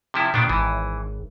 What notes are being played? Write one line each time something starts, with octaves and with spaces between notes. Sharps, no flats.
C3 F3 E4
A#2 D#3 B3 D4
G#1 E3